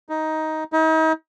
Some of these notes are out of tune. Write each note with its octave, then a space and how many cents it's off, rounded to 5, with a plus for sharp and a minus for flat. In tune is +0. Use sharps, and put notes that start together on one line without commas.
D#4 +10
D#4 +40